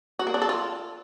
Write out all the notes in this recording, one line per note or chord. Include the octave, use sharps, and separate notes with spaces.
F#4
A#3
D4
A4
F4